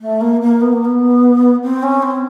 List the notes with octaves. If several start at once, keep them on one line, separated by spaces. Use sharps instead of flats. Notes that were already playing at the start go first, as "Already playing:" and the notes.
A3
A#3
A#3
B3
A#3
B3
C4
C#4
C4